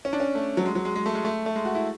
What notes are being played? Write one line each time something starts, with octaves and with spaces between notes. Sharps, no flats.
C#4
D4
C#4
A3
F#3
G#3
F#3
G#3
G#3
A3
G#3
A3
A3
G#3
F#4
E4